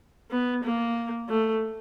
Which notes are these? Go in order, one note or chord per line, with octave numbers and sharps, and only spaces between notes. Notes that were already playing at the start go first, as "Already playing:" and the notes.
B3
A#3
A3